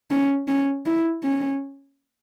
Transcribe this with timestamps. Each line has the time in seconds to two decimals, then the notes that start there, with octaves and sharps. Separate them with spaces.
0.11 C#4
0.48 C#4
0.86 E4
1.23 C#4